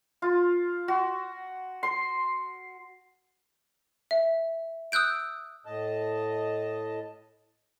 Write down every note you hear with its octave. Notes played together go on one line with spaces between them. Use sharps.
F4
F#4
C6
E5
D#6 E6 F#6 G6 D7
A2 D#5 A5